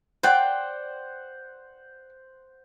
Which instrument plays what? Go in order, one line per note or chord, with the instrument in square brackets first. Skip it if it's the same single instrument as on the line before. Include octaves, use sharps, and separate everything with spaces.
[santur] C5 F#5 [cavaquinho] D5 G5 C6